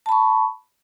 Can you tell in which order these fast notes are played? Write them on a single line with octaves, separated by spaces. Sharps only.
A5 B5 C#6